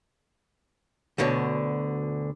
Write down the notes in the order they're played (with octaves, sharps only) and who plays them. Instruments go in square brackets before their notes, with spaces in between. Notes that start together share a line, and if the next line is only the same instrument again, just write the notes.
[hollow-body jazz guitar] D2 B2 D3 C#5